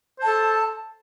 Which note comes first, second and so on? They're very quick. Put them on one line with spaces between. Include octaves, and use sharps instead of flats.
C5 A5 A4